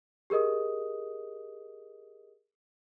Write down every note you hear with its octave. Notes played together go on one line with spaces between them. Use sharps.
G4 G#4 A#4 D#5 D#6